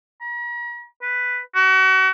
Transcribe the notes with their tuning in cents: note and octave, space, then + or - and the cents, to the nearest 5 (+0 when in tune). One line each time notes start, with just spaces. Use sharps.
A#5 +45
B4 +5
F#4 +35